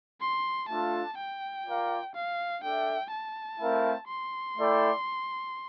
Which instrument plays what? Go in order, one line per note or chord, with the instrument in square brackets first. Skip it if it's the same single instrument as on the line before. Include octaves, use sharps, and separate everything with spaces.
[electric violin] C6
[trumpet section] A3 D4 F4 A4 [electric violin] A5
[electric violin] G5
[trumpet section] F4 A#4 D5 F5
[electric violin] F5
[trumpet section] D4 A4 E5 [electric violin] G5
[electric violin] A5
[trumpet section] A3 C4 E4 A#4 F5
[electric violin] C6
[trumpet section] A3 E4 A4 D5 G5